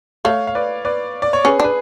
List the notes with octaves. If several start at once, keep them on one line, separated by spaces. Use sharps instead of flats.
A3 C#5 F5
F5
B4 D5
B4 D5
D5
C#5
C#4 G#4 B4
D4 B4